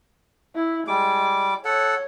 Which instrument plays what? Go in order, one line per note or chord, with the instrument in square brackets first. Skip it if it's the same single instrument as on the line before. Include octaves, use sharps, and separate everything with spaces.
[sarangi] E4
[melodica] G3 D6 [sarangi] G#3
[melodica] A4 F#5 [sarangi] C#5